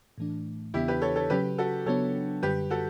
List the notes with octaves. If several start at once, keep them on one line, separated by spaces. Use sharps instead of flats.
A2 E3 A3 D4
E2 C#3 E3 B3 D4 E4 G4
G4 B4
A4 C#5
A4 C#5
C#3 F#3 C#4 G4 B4
F#4 A4
C#3 F#3 B3 D4 A4 C#5
F#2 D3 G3 G4 B4
F#4 A4